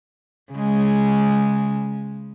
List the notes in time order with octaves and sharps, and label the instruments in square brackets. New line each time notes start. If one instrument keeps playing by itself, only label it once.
[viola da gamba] C#3 G#3